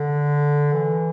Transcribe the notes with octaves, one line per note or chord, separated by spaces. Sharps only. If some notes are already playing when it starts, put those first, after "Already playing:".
Already playing: D3
E3